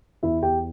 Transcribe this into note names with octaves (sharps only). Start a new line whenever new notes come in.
E2 E4 E5
E2 G4 G5